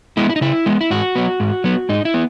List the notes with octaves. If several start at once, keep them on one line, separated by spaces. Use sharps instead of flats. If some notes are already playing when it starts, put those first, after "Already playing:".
G#3 B3 E4
E4
D#4
C#3 E4
G#3 B3
E4
G#2 F#4
F#3 B3
G#2
F#3 B3
G#2 D#4
E4
B3